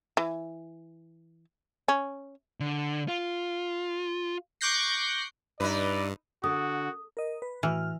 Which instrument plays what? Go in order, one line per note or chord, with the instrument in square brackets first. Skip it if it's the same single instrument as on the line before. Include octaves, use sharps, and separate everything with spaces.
[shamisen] E3
C#4
[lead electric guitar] D3
F4
[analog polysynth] C#6 D6 F#6 G6 A#6 C7
[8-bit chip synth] G2 [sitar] D#4 E4 B4 [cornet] D5
[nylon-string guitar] D3 [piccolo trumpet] F#4 [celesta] D#6
[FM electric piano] A#4 D#5
B4
[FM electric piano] A2 F#4 F6 [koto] E3